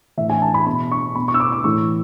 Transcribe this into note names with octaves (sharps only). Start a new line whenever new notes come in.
A2 E3 E5
G#5
A5
B5
B2 B5
C#6
B2 B5
C#6
E6
D6
D6
A2 E3 C#6